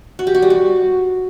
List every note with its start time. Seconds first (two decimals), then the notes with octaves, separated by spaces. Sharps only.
0.19 F#4
0.27 G4
0.35 F#4
0.42 G3
0.50 F#4